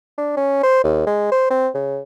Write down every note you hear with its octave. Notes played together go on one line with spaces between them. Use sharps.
D4
C#4
C5
D#2
G#3
C5
C4
C#3